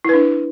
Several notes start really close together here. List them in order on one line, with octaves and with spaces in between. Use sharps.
E4 B4 D4